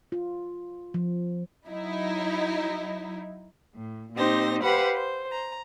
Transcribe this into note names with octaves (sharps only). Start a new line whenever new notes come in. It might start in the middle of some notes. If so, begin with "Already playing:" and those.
F4
F3
F#3 D#4 E4
A2
A#2 C4 D#4 G4 C5 A#6
G4 B4 C5 F5 F#5 B5
C5
A#5